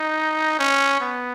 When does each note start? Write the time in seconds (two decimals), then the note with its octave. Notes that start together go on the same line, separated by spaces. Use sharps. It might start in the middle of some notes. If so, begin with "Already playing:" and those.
Already playing: D#4
0.59 C#4
1.00 B3